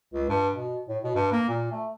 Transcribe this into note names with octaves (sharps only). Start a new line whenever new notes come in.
C#2
G2
B2
A2
B2
G2
A#3
A#2
A3